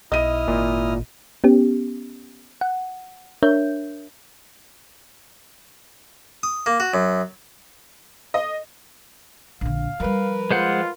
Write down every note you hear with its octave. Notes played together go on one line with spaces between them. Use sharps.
B1 E4 D#5 D#6 F6 D#7
G#1 A#2
B3 C#4 G4
F#5
D4 A#4 C#5 E5 G6
D#6
A#3
F#4
F#2
D#5
A#1 D3 F5
F3 G3 A#4 B4
G#3 F4 C5 F#5